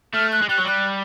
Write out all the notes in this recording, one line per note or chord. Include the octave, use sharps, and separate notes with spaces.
A3 F6
F#6
G#3
G3 F#6
F#3
G3 F#6